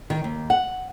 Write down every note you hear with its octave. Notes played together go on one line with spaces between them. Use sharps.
D#3
D#2
F#5